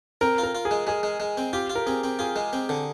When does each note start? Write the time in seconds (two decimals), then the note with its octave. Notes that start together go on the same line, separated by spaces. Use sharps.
0.21 C4 A#4
0.38 F4
0.43 A#4
0.55 F4
0.65 G#4
0.71 G#3
0.87 G#3 G#4
1.03 G#3
1.20 G#3
1.37 C4
1.53 F4 G4
1.70 F4
1.75 A#4
1.86 C4 G#4
2.04 C4
2.19 F4 G#4
2.36 G#3
2.53 C4
2.69 D3